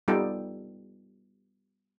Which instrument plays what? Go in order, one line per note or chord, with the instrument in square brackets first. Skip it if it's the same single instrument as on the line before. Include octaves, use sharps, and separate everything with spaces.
[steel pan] G3 B3 D#4 F4 A4 G5